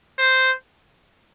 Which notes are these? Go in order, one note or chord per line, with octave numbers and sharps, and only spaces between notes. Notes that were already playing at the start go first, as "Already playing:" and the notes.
C5